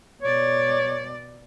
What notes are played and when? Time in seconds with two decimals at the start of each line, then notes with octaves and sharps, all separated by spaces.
0.22 B2 C#5 D5